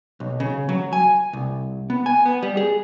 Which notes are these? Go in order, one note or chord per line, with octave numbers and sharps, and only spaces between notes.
B1
C#3
F#3
G#5
C2
B3
G#5
B3
G3
G#4